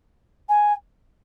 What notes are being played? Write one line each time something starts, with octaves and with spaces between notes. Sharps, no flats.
G#5